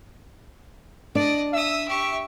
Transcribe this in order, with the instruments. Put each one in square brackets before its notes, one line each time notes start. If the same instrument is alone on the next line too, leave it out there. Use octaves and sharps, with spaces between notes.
[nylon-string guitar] D4 [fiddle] D5 D#5
[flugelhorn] E5 [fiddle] D#6 E6
[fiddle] G4 C#6